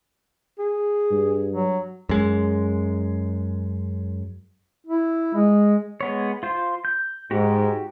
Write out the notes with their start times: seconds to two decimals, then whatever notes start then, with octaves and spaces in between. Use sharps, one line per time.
0.59 G#4
1.11 G2
1.53 F#3
2.09 F#2 G#3
4.86 E4
5.35 G#3
6.01 G#3 B3 C#5
6.43 F4 C5
6.85 G6
7.31 G#2 F#4 G4